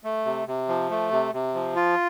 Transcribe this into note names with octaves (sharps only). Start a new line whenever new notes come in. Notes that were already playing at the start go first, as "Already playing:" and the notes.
A3
C3
C3
F3
A3
C3
C3
F3
F4